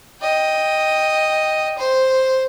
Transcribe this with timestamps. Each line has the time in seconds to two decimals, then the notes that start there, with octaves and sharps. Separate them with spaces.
0.20 D#5 G5
1.78 C5